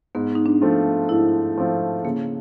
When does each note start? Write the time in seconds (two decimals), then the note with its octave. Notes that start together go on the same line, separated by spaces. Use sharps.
0.15 G#2 B3
0.35 D#4
0.46 D4
0.61 F3 A3 C4 F4
1.09 G#2 E4
1.57 F3 A3 C4 F4
2.04 C#3 A#3